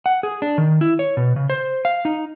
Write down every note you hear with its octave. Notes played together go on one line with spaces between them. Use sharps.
F#5
G#4
D4
D#3
E4
C#5
B2
C#3
C5
F5
D#4